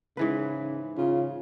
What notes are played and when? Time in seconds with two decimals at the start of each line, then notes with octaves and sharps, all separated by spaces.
0.17 G#2 C#3 E3 B4
0.98 C#3 F4